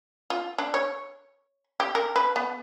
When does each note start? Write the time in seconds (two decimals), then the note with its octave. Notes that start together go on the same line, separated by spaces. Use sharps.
0.30 F4
0.58 D4
0.74 C#5
1.80 G4
1.95 A#4
2.16 B4
2.36 B3